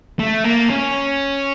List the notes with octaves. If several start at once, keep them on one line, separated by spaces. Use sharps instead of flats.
A3
A#3
C#4